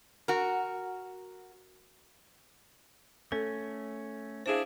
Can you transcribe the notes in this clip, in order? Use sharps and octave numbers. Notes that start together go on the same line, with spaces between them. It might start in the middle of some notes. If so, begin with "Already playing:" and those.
F#4 A#4
A3 C#4 A4
D4 E4 G#4 C5 F5